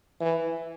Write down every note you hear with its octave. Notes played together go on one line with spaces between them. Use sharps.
E3